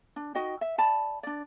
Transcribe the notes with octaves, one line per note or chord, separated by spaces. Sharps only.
D4
D#4 F#4 D#5 G5
E5
D5 A5 B5
D4 D5